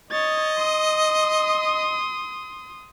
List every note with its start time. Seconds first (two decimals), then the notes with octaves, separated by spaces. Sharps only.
0.11 C#5 D#5 A6
0.57 C6 D#6